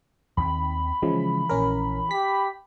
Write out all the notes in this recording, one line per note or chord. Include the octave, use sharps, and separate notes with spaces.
D#2 D#3 C4 B5
C#3 E3 F3 G#3
A#1 C#4 A#4
G4 B6